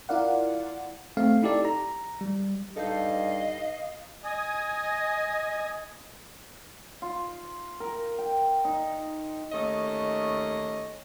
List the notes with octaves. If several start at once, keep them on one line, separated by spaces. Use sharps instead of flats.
E4 F4 A#4 D5 F5 F#5
A3 C4 F5
D#4 E4 G4 A4 D5
A#5
G3
G2 D#4 A4 D#5 F5
D#5 G#5 D#6
F4
A#4
G5
D#4
D#2 A3 C#4 D#5